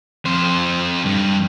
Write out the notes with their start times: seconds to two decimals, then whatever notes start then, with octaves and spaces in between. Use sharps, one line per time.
0.25 F2 C5
1.05 G2